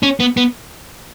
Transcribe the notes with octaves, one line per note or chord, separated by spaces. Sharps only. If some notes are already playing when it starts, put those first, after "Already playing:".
C#4
B3
B3